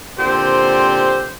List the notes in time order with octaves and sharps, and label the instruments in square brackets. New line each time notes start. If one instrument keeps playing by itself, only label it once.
[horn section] A#2 D3 C4 G4 C5